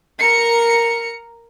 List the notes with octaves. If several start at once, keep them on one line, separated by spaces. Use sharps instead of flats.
A#4 C#7